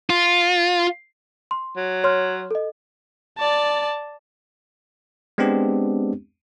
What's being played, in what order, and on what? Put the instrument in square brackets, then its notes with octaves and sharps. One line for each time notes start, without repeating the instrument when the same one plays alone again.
[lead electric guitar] F4
[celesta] C6
[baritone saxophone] F#3
[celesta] C#5 C6 F6
A4 D#5
[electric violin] D5 A5
[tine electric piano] G#3 B3 C4 D4 G4